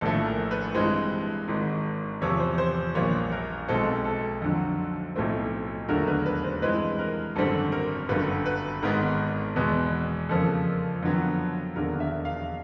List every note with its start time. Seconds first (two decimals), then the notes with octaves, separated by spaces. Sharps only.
0.01 A#1 A2 F3 A3 A4
0.26 A#4
0.51 B4
0.75 G2 E3 G#3 C4
1.48 G#1 G#2 D#3
2.21 E2 C3 F3 C#5
2.40 C5
2.58 C5
2.95 A#1 A#2 G3 A#3 C#5
3.32 A#4
3.68 B1 B2 G#3 C4 A4
4.05 A4
4.42 F2 D3 F#3
5.16 B1 A2 F3 A3 C4
5.89 E1 D#2 D3 F#3 A3 A#4
6.07 B4
6.26 B4
6.44 C5
6.62 G2 E3 G#3 C4 B4
6.99 A#4
7.36 G#1 F#2 D3 G3 C4 A4
7.72 A#4
8.09 G1 F#2 D3 B4
8.46 B4
8.83 G#1 G#2 D#3 G#3 B3 A#4
9.56 E2 B2 G#3 B3
10.29 F2 C#3 F3 A#3 A4
11.03 F2 D3 F#3 B3
11.76 E1 D#2 D3 A#4
12.00 E5
12.25 F5